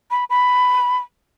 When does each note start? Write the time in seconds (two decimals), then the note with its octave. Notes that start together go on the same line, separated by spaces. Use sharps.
0.11 B5
0.30 B5